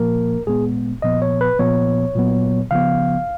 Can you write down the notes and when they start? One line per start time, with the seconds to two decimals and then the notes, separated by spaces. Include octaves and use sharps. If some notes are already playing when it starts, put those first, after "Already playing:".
Already playing: A#2 F3 A#3 A#4
0.47 A#2 G#3 B3 G#4
1.02 A#2 F3 B3 D#5
1.22 C#5
1.41 B4
1.59 A#2 F3 B3 C#5
2.15 A#2 F#3 B3
2.71 C#3 F3 B3 F5